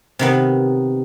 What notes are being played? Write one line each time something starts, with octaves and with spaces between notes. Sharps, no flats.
C3 D#3 B3